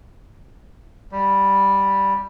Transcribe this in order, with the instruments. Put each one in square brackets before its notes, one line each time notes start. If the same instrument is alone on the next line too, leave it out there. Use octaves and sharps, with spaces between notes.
[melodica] G3